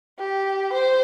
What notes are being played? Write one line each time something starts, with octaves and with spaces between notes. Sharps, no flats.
G4
C5